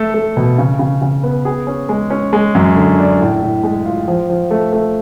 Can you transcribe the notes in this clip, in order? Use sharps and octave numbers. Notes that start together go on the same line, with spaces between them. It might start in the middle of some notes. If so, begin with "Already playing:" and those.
Already playing: A3 A4
A3
B2
C#3
C#3
C#3
B3
G#4
C#4
G#3
C#4
G#3
F#2
D3
D4
A2
A2
G#3
F4
F3
F3
A3
A3